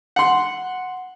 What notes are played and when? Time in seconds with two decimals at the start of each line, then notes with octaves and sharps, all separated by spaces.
0.16 F#5 C6